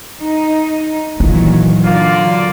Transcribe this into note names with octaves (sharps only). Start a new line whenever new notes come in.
D#4
A#2 D#3 E3 F#3
D3 F#3 A#3 F4 D5